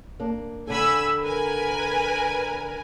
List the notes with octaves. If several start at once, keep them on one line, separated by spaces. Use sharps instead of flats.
A#3 D4
D3 G4 A4 G#5 B5 E6
A#4 B4 G#5